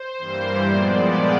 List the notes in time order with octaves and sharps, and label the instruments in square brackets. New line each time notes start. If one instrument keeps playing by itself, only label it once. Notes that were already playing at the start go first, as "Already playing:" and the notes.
Already playing: [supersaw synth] C5
G2 E3 G3 A#3
A#2 F3 G#3 B3 D5